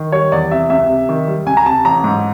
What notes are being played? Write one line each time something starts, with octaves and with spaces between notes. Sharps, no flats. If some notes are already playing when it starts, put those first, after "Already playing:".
Already playing: D#3
G3 C#5
E2 D5
C3 E5
C#2 E5
C3
D#3
G3
C#2 G#5
A#5
C3 A5
A1 A#5
G#2